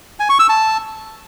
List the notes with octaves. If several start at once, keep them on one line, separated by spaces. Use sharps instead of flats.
G#5
C#6
E6
A5